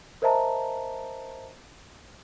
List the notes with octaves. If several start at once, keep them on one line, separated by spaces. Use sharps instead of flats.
A#4 C5 D#5 E5 A5 A#5